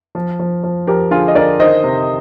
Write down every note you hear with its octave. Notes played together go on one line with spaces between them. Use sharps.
F3
F3
F3
F3 G4 A#4
D3 F4 G#4
D#5
D3 A#4 D5
D#3 C5 D#5
C3